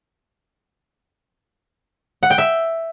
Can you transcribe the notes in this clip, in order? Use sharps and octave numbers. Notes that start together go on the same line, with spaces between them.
F#5
G5
E5